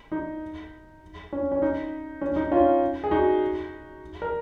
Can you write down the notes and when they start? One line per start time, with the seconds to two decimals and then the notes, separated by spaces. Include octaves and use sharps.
0.12 D#4
1.33 C#4
1.52 C#4
1.62 D#4
2.21 C#4
2.36 D#4
2.51 C#4 F4
3.04 G#4
3.11 D#4 F#4
4.22 A#4